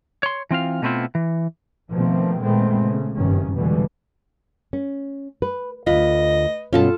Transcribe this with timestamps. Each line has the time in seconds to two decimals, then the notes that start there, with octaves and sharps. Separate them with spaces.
0.23 C#5 C6
0.51 E3 C4 F4 F5
0.82 B2 A3 B3 C4 E4 F4
1.15 E3
1.92 B2 D#3 F3 A3 A#3 C4
2.43 A#2 D#3 G#3 A3 B3 C4
2.85 C#3
3.16 F#1 G2 C3 D#3 C#4
3.55 F1 B2 D3 E3 G3 G#3
4.73 C#4
5.42 B4
5.87 D2 F4 B4 D#5
6.73 G2 B2 C#4 F4 A4 A5